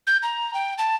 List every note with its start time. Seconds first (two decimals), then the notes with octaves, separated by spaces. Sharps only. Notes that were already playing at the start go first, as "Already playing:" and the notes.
0.07 G6
0.23 A#5
0.54 G5
0.78 A5